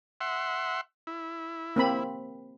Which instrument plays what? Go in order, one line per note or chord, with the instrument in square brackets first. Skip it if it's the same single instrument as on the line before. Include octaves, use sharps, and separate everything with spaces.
[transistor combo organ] E5 F#5 C6
E4
[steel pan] A#3 C4 B5